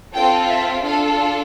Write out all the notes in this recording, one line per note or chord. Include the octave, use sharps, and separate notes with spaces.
C4 F4 A4 G5
E5
D4 F4 A4 F5